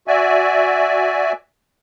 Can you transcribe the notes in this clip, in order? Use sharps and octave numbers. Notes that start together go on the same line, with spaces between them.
F#4 D5 E5 G#5